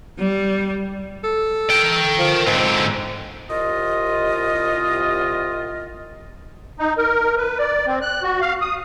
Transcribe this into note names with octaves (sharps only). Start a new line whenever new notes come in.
G3
A4
A#4 G5
F3
G#2 D3 C4
C2 F4 D#5
D#4
A#4
B4
D5
C4
F#6
F#4
F5
D#6